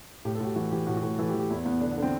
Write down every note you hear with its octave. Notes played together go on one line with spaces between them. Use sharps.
A2 G4
A4
A2 F#4
G4
E3 F#4
E3 G4
A2 F#4
F#4
A2
E3 A4
G4
E3
G4
E2 E4
E2 B3
D3 D4
B3
D3 C4